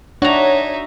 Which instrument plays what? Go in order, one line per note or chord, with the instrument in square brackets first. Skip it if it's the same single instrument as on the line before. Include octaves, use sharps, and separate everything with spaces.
[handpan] D4 [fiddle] D#4 E5 [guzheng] F#4 A#5 [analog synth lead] C#5